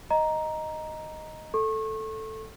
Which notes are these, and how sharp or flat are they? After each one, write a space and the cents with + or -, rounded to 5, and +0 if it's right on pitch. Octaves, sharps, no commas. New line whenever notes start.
D#5 +0 A#5 +5
A4 +0 C#6 -30